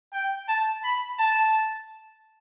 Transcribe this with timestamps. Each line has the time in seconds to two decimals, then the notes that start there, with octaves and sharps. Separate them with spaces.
0.13 G5
0.49 A5
0.84 B5
1.19 A5